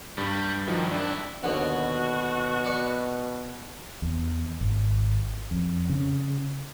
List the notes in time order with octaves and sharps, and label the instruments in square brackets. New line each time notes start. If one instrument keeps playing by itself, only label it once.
[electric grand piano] G2 [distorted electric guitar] G3
[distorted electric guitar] G2 [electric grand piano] D#3 F3 F#3
[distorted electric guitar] G2 E4 [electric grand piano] D4
[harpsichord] D#2 D3 B3 [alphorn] B2 [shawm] F#4
[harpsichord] B4 D5 C#6
[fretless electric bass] E2
G#1
F2
C#3